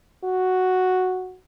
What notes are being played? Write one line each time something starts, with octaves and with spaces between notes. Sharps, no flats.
F#4